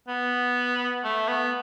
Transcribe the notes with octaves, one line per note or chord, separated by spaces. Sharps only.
B3
A3
B3